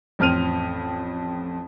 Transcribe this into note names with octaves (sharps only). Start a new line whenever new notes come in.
A1 F2 C4 F6 D#7 F7